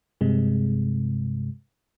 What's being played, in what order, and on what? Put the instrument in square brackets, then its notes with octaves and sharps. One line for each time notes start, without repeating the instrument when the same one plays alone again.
[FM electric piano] G2 C3 G#3